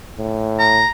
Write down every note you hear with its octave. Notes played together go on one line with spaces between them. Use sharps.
A2
A#5